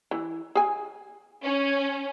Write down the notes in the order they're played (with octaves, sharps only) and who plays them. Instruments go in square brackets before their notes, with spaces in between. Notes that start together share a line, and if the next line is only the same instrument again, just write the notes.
[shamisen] E3
G#4 G#5
[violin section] C#4